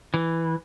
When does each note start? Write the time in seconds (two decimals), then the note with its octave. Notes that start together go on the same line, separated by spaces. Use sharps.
0.14 E3